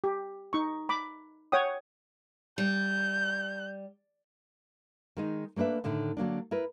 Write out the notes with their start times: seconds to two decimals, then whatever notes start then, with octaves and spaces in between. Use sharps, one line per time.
0.04 G4
0.53 D#4 C#6
0.89 B5 D6
1.52 C#5 F#5 G5 D#6
2.58 G3 G6
5.17 D#3 G#3 D#4
5.56 A3 A#3 D4 B4 E5
5.84 A2 D3 D#3 A3
6.17 D3 F#3 A#3 D4
6.51 E4 A#4 B4